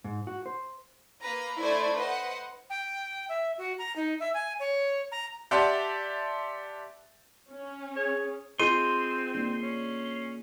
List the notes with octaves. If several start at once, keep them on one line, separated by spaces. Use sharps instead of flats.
G#2
F#4
C5
A#3 B4 A#5
A3 D4 E4 C5 D5 G#6
B4 C5 D#5 F#5
G5
E5
F#4
A#5
D#4
E5
G#5
C#5
A#5
G4 D5 E5 F#5 A5 C6
C#4
G#4 C#5
C4 F4 G#4 D#5 C6 D#7
A#3 D4
C#4